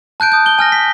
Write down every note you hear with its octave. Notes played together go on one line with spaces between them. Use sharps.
A5 F#6 G6 D7
D#6 G6
G7
G#5 F6 A#6
B6